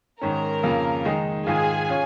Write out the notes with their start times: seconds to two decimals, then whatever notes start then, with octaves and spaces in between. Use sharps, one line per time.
0.21 G#2 D#3 C#4 A#4 A#5
0.63 F2 C#3 A#3
1.05 D#3 G#3 D#4
1.47 G#2 D#3 G#3 F4 G#4 G#5
1.89 C#4 F4